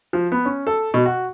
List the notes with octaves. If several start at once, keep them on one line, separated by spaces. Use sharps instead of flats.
F3
B3
C#4
A4
B2
F#4